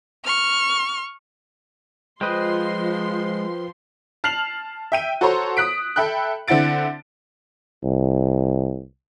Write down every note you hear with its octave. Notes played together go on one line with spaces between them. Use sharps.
C#6 F6
F3 G#3 B4 C5 D#5 G5 C6
A5 F6 C7 F7 F#7
E5 G5 D#7
F#4 A4 C5 C#5 A#5 C6
D#6 F#6 B6 D7
A4 E5 G5 B5 F#6
D3 C4 E4 F#5 A6 D7
C2